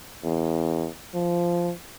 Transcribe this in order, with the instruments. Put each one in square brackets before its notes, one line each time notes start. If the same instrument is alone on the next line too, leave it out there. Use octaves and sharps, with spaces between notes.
[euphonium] E2
F3